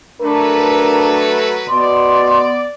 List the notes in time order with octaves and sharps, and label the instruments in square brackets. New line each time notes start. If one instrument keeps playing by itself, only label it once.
[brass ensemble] F#3 A3 B4 [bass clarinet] D4 [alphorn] A#4
[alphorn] B2 [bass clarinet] B3 [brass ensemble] D5 [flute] C6